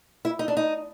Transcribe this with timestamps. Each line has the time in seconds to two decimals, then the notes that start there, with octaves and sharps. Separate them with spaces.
0.25 E4
0.39 D#4
0.48 D4
0.57 D#4